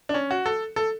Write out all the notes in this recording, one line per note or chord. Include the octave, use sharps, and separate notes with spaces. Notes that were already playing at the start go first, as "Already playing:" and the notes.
D4
C#4
F#4
A4
A4